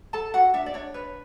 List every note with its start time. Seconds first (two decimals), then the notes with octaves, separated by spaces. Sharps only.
0.13 A4 A5
0.34 F#4 F#5
0.54 D4 E5
0.66 D5
0.74 D4 C#5
0.94 B4 C#5